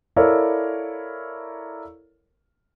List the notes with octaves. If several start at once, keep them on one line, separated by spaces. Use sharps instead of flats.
E4 A4 A#4 C#5 D5 F5